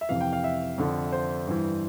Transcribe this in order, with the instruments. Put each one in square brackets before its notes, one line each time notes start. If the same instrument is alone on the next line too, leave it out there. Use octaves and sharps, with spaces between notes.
[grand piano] E5
F2 C3 E3 F5
G5
F5
E5
F2 D3 F3
C5
G2 E3